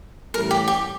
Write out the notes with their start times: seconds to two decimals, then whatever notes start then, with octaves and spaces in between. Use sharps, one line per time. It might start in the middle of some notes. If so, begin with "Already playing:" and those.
0.33 A1 A2 G3 A#4
0.51 G4
0.68 G4